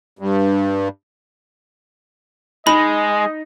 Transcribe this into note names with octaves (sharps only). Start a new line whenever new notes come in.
G2
G#3 D#4 D#5 B5